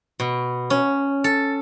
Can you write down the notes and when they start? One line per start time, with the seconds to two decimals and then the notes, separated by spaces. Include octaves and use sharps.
0.20 B2
0.70 C#4
1.24 A4